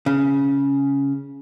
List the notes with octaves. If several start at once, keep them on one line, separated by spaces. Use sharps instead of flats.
C#3